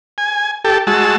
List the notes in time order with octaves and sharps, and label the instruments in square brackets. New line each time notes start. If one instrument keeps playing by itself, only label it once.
[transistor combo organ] G#5
G4 A4
G#3 F#4 A5 E6